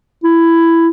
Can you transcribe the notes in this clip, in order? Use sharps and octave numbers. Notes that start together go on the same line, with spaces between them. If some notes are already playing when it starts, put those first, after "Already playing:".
E4